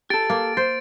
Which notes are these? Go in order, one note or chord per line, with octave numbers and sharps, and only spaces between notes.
G4 A4 A6 D7
A#3
C5 A6